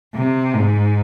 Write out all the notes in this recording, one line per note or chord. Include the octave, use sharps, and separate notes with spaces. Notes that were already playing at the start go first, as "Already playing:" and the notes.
C3
G#2